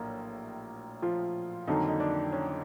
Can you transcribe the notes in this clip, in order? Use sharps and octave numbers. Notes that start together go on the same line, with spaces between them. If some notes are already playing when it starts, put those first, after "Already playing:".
Already playing: A#1 A2 F#3 A#3
F3 F4
F2 D3 D#3 F#3 A#3 D#4
D#4
D4
C#4